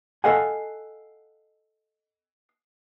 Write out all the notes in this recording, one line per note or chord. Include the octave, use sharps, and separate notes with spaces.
A4 D#5 F5 F#5 G#5